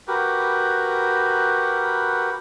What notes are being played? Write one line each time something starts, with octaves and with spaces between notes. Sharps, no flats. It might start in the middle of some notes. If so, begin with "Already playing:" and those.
F#4 G4 A#4 B4